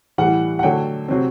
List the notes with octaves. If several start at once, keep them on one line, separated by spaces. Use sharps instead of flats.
A2 E3 G3 F#5
F#5
D3 F#3 A3 G5
C3 F#3 C4